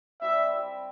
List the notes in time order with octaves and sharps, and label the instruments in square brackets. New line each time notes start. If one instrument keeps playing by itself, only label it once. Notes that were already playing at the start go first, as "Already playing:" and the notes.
[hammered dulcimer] G3 C4 E4 G4 [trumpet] E5
[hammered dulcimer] G3 C4 E4 G4